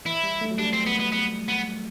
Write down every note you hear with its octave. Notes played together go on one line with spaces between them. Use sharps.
E3 E4
G3
A3
F#3
G3 D4
C4
B3
B3
B3
B3